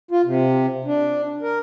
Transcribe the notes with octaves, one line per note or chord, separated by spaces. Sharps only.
F4
C3
D4
A#4